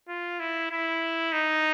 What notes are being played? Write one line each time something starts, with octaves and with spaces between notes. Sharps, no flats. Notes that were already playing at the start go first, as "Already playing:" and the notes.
F4
E4
E4
D#4